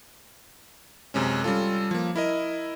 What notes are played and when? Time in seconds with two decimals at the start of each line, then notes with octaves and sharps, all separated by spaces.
1.14 F#2 C3 G#3 C#4
1.44 G3 C#4 F4 A4
1.91 F3 A#3
2.16 E4 A#4 D#5